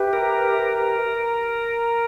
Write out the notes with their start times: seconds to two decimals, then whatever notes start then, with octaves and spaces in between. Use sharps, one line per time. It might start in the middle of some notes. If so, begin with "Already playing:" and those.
Already playing: G4 B4 E5
0.13 A#4